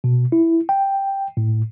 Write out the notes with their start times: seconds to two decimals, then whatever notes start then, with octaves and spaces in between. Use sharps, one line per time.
0.04 B2
0.32 E4
0.69 G5
1.37 A2